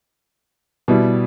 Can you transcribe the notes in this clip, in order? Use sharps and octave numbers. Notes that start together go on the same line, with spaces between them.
B2 G3 E4